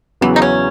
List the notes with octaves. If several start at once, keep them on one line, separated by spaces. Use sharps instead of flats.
E2 C#3 E3 F#3 B3 E4
D#4
C#4